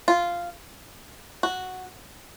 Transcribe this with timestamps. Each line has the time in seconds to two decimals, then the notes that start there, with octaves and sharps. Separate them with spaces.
0.08 F4
1.43 F#4